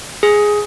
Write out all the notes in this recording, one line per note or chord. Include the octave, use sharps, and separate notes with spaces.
G#4